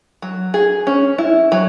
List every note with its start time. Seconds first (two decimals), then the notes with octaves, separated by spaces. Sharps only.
0.22 F#3
0.54 G#4
0.87 C#4
1.18 E4
1.52 F#3